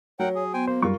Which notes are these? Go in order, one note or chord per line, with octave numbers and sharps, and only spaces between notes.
F#3 A#4 C#5 F#5 G5
G#4
B3 C5 G5 G#5
A#3 C5
F#2 G3 F4 A#4 C#6